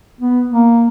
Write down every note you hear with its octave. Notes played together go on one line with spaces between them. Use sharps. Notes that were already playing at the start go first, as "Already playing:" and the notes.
B3
A#3